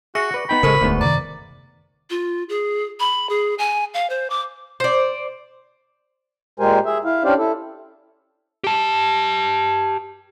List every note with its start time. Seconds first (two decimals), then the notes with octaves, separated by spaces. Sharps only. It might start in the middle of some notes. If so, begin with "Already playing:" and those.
0.15 F#4 G#4 E5 C#6 A#6 C#7
0.34 B4 D5
0.49 B3 D#4 G5 B5
0.63 A1 C#3 G#3 A4 A#4 C5 G#5 C#6
0.81 E1 D2 G#2 B3
1.01 F#2 C3 D#3 D5 A#5
2.10 F4
2.49 G#4
3.00 B5
3.30 G#4
3.59 G#5
3.94 F5
4.10 C5
4.30 D6
4.80 C5 D5
6.60 A#2 G#3 G4 A#4 C5 G#5
6.86 G#4 E5
7.05 E4 F5
7.24 C#4 D4 G4 C5 D5 F5
7.38 E4 A4
8.64 G4 A5